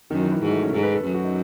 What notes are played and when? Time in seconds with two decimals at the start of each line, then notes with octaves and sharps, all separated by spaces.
0.11 F#2 D#3
0.21 E3
0.32 E3
0.42 G#2 F#3
0.52 A3
0.63 C#4
0.73 G#2 A4
0.83 B4
0.94 A4
1.04 F#2 A4
1.14 F#4
1.25 D#4